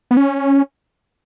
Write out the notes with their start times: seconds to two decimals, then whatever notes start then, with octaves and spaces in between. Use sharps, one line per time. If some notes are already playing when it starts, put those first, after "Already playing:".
0.11 B3
0.17 C#4